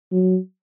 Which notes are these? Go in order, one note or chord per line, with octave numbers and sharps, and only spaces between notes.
F#3